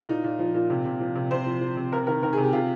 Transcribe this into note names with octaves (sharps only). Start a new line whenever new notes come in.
A#2 D#4
A#2
F3
A#2
C3
C3
F3
C3
C3 C5
F3
F3
C3
C3 A#4
D#3 A#4
D#3 A#4
G#4
C3
G4
C3 F4